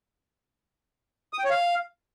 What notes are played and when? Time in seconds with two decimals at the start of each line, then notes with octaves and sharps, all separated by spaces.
1.33 D#6
1.39 G5
1.44 C#5
1.50 F5